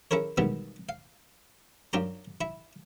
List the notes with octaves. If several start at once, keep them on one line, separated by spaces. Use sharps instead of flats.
C#4 E4 G#4 A#4 C#5
B2 D#3 E3 G3 G#3 B3
F5
F#2 D4 F4 G4 A#5
E4 E5